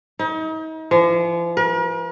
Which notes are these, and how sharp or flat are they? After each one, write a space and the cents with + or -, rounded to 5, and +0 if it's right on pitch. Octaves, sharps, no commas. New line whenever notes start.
D#4 +40
F3 -40
A#4 +45